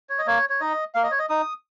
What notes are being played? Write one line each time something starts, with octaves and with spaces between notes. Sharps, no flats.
C#5
D#5
A#3 C#5
C#5
D#4 D#5
A#3 F5
D#5
C#5
D#5
D#4 D#6